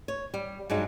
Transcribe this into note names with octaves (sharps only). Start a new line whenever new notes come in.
C#5
G3
G2 F#3 G#3 D#4